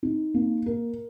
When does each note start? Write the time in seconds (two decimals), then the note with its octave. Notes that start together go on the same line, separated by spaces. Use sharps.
0.03 D#4
0.34 A#3
0.66 A#4